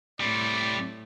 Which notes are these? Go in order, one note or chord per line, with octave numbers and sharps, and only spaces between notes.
A2 G3 C4 D5